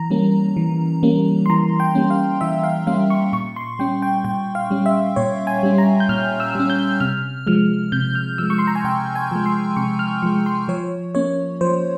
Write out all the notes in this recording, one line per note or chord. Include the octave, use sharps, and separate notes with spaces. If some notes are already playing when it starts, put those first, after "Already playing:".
Already playing: E3 A#5
G3 A#3 C#4
E3
G3 A#3 C#4
C6
E3 A#5
G5
G3 A#3 C#4
F5
E3 E5
F5
G3 A#3 C#4 F5
C#6
A#2 C#6
C6
G3 C#4 G5
G5
A#2 G5
F5
G3 C#4
E5
A#2 C#5
G#5
G3 C#4
A#5
G6
A#2 F6
E6
G3 C#4
G6
C3 F6
F3 G#3 F6
C3 G6
F6
F3 G#3 E6
C#6
C6
A#5
G#5
C3 G5
G#5
F3 G#3
C6
C3 C#6
F6
F3 G#3 C#6
C6
F3 C#5
A#3 C#4 C#5
F3 C5